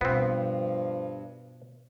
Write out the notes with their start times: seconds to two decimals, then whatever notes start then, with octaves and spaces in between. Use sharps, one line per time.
0.01 G2 B2 F3 B3 C4